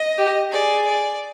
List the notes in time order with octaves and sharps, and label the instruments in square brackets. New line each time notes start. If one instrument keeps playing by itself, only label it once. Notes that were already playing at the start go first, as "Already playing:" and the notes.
Already playing: [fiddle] D#5
[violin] G4
[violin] G#4 [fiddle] D5
[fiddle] D5